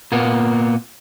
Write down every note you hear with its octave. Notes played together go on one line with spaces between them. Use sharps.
A#2 A#3 B3